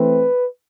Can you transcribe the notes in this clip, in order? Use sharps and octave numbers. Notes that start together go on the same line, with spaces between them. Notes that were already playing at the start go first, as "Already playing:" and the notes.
Already playing: E3 A3 C4 B4